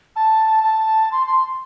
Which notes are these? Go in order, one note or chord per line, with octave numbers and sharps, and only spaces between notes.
A5
A5
C6
C6